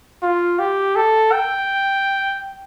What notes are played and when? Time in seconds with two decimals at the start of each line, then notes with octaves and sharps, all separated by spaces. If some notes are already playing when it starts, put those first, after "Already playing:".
0.22 F4
0.59 G4
0.96 A4
1.32 G5